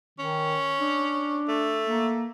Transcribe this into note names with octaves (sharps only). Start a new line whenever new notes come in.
D#3 C#4
D4
A3
A#3